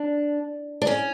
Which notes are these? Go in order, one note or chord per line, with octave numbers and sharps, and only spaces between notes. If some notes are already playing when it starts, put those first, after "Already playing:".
Already playing: D4
D4
C#4